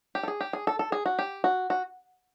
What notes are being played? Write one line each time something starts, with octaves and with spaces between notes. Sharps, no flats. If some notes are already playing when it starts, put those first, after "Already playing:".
G4
A4
G#4
G4
G#4
A4
A4
G#4
F#4
G4
F#4
F#4